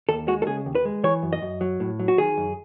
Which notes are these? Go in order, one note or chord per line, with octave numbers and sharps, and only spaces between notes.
D#2 A4
G#3 F#4
A4
C#3 G#4
D#2
B4
G#3
E3 C#5
F#2
D#5
F#2
F#3
A2
F#3
F#4
D#3 G#4
F#2